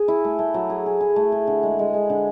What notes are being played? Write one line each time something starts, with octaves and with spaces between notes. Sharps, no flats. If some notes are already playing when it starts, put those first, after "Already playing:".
Already playing: G#4
E4
A3
A3
F#3
G#4
G#4
G#4
A3
G#4
D3
G#3
G#3
G#3
D3